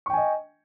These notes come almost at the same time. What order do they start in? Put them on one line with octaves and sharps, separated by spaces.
C#6 G5 G#5 D#5